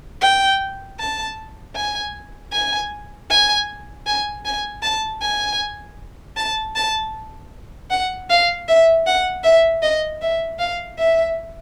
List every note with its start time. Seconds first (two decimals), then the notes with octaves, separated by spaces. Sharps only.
0.22 G5
1.00 A5
1.76 G#5
2.53 G#5
3.30 G#5
4.07 G#5
4.45 G#5
4.83 A5
5.22 G#5
6.37 A5
6.76 A5
7.91 F#5
8.30 F5
8.68 E5
9.07 F#5
9.44 E5
9.83 D#5
10.22 E5
10.59 F5
10.98 E5